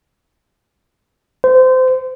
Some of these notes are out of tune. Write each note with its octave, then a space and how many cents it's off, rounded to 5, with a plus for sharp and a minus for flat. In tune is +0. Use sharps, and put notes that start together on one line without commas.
C5 -25